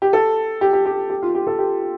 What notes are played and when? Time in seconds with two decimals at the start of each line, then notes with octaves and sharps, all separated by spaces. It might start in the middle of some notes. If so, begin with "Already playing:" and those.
0.02 G4
0.13 A4
0.61 G4
0.73 G4
0.86 G4
1.10 G4
1.22 F4
1.35 G4
1.47 A4
1.59 G4